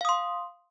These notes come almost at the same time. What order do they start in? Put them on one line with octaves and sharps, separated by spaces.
F5 D#6 C6